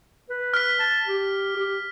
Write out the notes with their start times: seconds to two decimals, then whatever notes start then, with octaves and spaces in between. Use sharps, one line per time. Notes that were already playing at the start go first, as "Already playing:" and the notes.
0.30 B4
0.54 F6 B6
0.80 A5
1.07 G4
1.56 G4